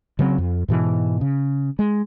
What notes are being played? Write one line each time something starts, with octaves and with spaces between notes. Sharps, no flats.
C#3 F#3 G3 C4
F2
G#2 B2 E3
C#3
G#3